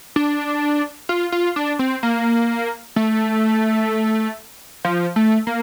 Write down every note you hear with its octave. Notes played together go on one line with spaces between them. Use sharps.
D4
F4
F4
D4
C4
A#3
A3
F3
A3
A#3